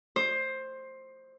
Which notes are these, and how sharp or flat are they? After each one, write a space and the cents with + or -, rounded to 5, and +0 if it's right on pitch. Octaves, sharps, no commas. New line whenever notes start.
C5 +15